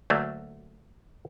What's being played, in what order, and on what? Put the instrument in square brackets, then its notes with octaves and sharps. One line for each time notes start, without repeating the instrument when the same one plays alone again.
[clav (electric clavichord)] D2 F#3 A3 A#3